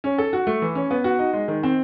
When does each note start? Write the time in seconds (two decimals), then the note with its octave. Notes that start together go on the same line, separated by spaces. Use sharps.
0.04 C#4
0.18 A4
0.33 F#4
0.47 A3
0.62 E3
0.75 C#4
0.91 B3
1.04 F#4
1.19 D#4
1.33 G#3
1.48 D#3
1.63 C4